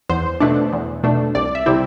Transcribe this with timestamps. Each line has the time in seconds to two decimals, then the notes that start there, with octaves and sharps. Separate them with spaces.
0.09 E2 C5
0.40 B2 A3 D4
0.72 E2
1.03 B2 A3 D4
1.35 C2 D5
1.55 E5
1.66 C3 G3 C4 E4